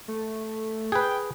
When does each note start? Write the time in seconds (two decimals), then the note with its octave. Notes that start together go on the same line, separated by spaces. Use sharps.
0.08 A3
0.92 G#4 B4 G5